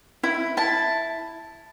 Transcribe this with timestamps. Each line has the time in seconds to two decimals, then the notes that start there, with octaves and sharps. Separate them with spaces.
0.23 E4
0.57 E4 A5